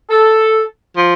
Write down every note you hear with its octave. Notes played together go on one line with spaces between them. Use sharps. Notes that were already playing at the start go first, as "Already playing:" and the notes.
A4
F3